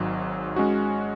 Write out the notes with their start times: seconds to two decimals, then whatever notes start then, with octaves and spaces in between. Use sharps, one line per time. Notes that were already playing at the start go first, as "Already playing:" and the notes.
Already playing: G#1 G#2 F#3
0.56 G#3 C#4 F#4